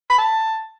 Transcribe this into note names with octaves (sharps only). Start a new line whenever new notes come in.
B5
A5